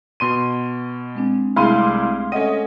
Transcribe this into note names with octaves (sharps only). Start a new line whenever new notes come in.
B2 C6 D#7
G#3 C4 D4
C2 G#3 A3 E4 G#4 F5 C6 D#7
D6
C#4 A4 D#5 E5 F#5 D#7